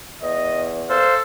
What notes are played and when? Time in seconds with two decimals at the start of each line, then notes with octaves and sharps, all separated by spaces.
0.22 E2 D#5
0.90 A4 C5 F5